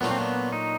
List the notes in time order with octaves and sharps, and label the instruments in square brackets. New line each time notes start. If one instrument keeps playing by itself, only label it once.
[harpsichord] A#2 F#3 A3 D4 F4 [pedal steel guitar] B3
[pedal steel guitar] C4
B3
D#4